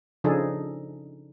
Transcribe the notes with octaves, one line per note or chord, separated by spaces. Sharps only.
C#3 F3 D4 D#4 G#4 A4